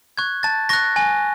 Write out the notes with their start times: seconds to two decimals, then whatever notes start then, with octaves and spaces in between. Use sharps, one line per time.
0.17 C#6 F#6 G#6
0.43 A5 A6
0.69 C#6 F#6 A#6
0.96 G#5